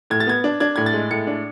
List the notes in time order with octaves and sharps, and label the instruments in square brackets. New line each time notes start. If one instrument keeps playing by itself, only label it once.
[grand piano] A2 G#6
A6
B3 G#6
D4
D4 G#6
A2 G#6
A6
G#3
A2 C#7
D4